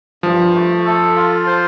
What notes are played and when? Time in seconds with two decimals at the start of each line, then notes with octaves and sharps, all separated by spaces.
0.23 G2 F3
0.54 A3
0.85 A4
1.16 F4
1.47 C5